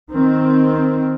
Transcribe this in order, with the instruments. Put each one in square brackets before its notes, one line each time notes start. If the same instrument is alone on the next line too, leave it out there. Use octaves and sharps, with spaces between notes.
[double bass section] D#3 C4